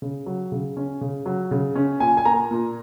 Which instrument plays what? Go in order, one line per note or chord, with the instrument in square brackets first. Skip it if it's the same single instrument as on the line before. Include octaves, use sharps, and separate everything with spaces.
[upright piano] C#3
F#3
C#3
C#4
C#3
F#3
C#3
C#4
A#2 G#5
G#5
A#3 A#5
A#2